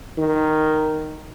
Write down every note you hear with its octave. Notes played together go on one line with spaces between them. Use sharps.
D#3